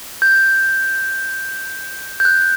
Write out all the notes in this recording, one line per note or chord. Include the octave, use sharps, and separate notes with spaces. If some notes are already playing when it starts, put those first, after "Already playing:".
G6
G6
F#6